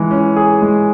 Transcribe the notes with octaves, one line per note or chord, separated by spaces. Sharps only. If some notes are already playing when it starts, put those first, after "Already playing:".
Already playing: E3 G#3
C#4
G#4
G#3